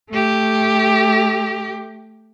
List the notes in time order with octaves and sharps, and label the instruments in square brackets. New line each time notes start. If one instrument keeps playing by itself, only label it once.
[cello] A3 G4